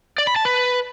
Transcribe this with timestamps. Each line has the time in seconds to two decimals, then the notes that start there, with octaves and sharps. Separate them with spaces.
0.18 D5
0.27 B5
0.36 A5
0.45 B4